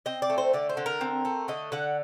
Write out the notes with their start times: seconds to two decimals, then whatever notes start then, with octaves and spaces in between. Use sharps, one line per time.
0.06 C4 D#5
0.22 D5
0.30 A3
0.38 C5
0.53 D3 D5
0.69 C5
0.77 D3
0.86 A#4
1.01 C4
1.25 A3
1.48 D3 D#5
1.72 D3 F#5